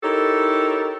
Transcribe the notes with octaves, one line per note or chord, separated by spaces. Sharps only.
D#4 E4 G4 A4 A#4 C#5